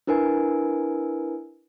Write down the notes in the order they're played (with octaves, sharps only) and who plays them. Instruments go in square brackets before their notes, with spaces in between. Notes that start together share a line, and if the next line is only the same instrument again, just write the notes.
[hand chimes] D4 E4 A#4 B4 G#5